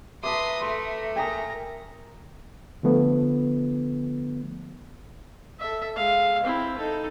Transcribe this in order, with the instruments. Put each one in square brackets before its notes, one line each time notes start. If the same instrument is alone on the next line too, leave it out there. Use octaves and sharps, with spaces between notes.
[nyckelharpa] B4 A#5 [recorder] E5 [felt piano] A5 D6 [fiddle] C6 D#6
[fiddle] A3 [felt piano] C6
[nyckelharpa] A#4 A#5 [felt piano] G5 G#5 D#6
[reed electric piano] D3 F3 A3 B3
[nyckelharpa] A4 E5
G#3 F5
C4 E4
D#4 A4